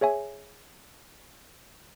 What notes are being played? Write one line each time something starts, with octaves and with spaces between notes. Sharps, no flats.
G#4 C#5 E5 G#5